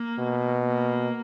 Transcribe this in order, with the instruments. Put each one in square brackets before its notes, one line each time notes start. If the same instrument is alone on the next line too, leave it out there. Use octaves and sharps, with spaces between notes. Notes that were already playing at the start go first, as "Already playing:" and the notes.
Already playing: [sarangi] A#3
[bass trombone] B2
[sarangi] A#3